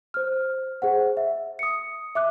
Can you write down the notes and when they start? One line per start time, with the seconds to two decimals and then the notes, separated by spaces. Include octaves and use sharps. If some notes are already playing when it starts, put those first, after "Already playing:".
0.14 C5 F6
0.82 G#4 C5 F#5
1.17 E5
1.59 D#6 C#7
2.15 E5 D6 F#6